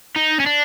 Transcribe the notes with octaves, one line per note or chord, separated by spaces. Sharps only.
D#4
C#4
D4